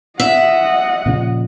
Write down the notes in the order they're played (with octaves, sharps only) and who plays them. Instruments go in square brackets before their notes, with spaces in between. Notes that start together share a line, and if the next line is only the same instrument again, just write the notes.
[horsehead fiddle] D#5 F#5 [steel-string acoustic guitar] E5
[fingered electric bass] A#2 C#3 F3